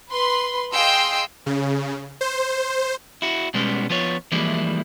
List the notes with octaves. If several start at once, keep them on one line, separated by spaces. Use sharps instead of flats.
B4 B5 C6
G#4 D#5 F5 G5 C6 E6
C#3
C5
E4 F#4
B2 G3 G#3 B3 C#4
F3 B3 F4 C#5
E3 F3 G3 G#3 A#3 E4